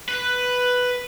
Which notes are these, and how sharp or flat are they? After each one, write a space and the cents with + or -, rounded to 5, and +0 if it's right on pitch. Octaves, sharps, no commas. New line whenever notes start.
B4 +5